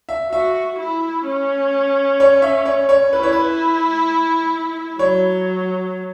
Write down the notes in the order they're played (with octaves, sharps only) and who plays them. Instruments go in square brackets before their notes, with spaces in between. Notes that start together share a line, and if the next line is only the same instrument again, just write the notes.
[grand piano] E5
[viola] F#4 [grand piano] E5
[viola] E4
C#4
[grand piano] C#5
E5
C#5
C#5
[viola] E4 [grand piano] B4
[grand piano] C#5
B4
[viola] F#3 [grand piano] C#5